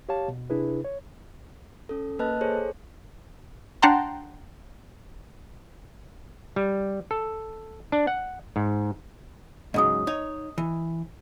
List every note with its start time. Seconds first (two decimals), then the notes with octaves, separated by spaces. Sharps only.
0.09 G4 C#5 F5 A5
0.28 B2
0.50 C3 D4 E4 G#4 B4
0.85 C#5
1.89 C#4 A4
2.19 A#3 B4 D#5 A5 F#6
2.41 G#4 A4 C5 C#5
3.82 D4 F#5 G5 A5 A#5 C6
6.56 G3
7.11 A4
7.92 D4
8.07 F#5
8.56 G#2
9.74 G#2 C#3 F#3 D#5 D#6
10.07 D#4 C#5
10.58 E3